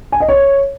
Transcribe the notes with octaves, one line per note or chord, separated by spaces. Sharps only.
G#5
D#5
C#5